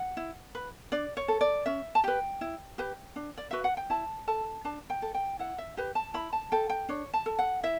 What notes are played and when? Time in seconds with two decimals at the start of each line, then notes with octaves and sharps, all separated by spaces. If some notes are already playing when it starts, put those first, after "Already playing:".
Already playing: F#5
0.17 E4
0.55 B4
0.92 D4 D5
1.17 C#5
1.28 A4
1.41 D5
1.66 C#4 E5
1.95 A5
2.04 G4 B4 G5
2.41 E4
2.78 G4 B4
3.16 D4
3.38 D5
3.51 F#4 B4 E5
3.64 F#5
3.77 G5
3.90 E4 A5
4.27 A4 A5
4.65 D4 A5
4.90 G5
5.02 A4
5.14 G5
5.39 E4 F#5
5.58 E5
5.77 G4 B4
5.95 A5
6.14 E4 B5
6.33 A5
6.52 A4 G5
6.70 G5
6.89 D4 C#5
7.14 A5
7.26 A4
7.39 F#5
7.63 E4 E5